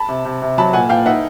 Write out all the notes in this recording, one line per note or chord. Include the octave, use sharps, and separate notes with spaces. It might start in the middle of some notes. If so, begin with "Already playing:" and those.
Already playing: A5 B5
C3
C3
C3
F#3 A5 B5
A#2 F#5 G#5
A#2 F5 G5
D#4 E5 F#5